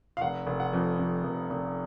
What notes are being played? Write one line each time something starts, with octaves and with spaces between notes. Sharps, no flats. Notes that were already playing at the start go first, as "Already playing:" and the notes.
F5
F1 F#5
F1
F#5
F2
F2
F1
F1